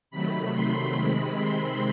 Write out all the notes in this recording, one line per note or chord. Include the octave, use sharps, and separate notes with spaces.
C3 D#3 F#3 A3 B5
C6
C3 D#3 G#3 C4 B5
C6